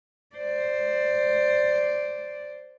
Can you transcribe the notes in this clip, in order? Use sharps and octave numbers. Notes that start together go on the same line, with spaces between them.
C5 D5